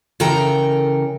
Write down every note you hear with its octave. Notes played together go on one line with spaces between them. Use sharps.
C#3 E3 A4 A#4 G5 A#5